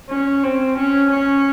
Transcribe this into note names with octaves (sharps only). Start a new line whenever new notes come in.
C#4
C4
C#4
C#4